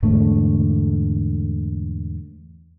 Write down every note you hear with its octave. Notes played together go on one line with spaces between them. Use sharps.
E2 G#2 D3 A3